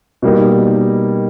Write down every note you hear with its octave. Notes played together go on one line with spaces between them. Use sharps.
B2 G3 A#3 D#4